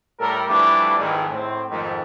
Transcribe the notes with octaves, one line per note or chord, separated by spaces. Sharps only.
A2 G3 A4 A#4
E3 F3 G3 A3 D4 E4
G#1 F2 G#2 D#3 E3 G#3
A2 C4
F2 G#2 D#3